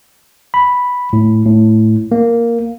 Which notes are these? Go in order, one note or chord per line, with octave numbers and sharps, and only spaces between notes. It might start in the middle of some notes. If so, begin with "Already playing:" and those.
B5
A2
A2
A#3